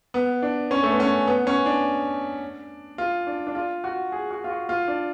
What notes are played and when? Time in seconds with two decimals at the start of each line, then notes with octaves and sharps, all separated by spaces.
0.14 B3
0.42 D4
0.71 C#4
0.83 A3
0.91 B3
1.00 C#4
1.27 B3
1.47 C#4
1.66 D4
2.98 F4
3.27 D4
3.47 D4
3.55 F4
3.84 F#4
4.12 G#4
4.31 F#4
4.44 F4
4.50 F#4
4.69 F4
4.88 D4